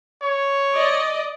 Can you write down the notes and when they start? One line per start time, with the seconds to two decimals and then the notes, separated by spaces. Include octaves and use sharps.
0.22 C#5
0.73 D5 D#5